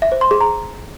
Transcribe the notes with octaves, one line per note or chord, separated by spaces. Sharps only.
E5
C5
C6
G#4
A#5